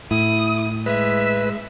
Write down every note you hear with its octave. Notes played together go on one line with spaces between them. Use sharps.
A2 E4 D#6
G#3 B4 E5